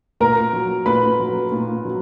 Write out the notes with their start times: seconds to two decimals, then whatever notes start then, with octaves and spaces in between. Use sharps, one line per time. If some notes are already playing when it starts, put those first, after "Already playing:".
0.20 A#2 A#4 A#5
0.53 F#3
0.86 A#2 B4 B5
1.19 F#3
1.52 A#2
1.85 F#3